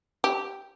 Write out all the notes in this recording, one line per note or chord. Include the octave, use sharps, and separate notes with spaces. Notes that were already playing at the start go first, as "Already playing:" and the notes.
G4